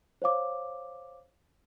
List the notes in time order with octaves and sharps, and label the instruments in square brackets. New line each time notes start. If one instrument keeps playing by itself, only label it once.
[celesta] C5 C#5 F5 D6